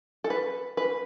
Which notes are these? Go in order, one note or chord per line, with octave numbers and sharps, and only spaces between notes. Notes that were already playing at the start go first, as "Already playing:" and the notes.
A4
B4
B4